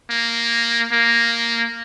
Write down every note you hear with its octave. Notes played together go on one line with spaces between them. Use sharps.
A#3
A#3